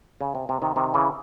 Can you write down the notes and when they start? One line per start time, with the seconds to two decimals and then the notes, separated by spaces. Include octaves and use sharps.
0.21 C#3
0.35 C3
0.49 C3
0.62 C3 D#3
0.76 C3 D#3
0.94 C#3 E3